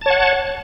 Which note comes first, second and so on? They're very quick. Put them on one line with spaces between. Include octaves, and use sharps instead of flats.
A5 C#5 F#5